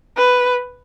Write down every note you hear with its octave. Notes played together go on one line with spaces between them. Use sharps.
B4